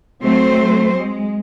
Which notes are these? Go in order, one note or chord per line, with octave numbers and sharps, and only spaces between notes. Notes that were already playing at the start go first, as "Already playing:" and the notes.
F#3 A3 C4 C5
G#3